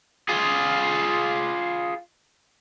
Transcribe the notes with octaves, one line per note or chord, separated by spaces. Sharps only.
F4 G#4